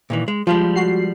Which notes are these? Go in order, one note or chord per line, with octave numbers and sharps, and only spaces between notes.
A#2 D#3 E3
G#3
F3 G3 G#3 F4
F#4 C7